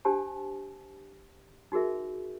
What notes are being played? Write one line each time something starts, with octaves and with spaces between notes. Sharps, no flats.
D4 G4 C5 G#5 A5
D#4 F#4 G#4 A#4 E5